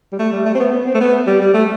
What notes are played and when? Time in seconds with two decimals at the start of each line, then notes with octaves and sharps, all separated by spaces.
0.12 G3
0.19 A3
0.33 G3
0.46 A3
0.55 C4
0.60 B3
0.73 B3
0.87 C4
0.94 A3
1.01 B3
1.27 G3
1.41 G3
1.54 A3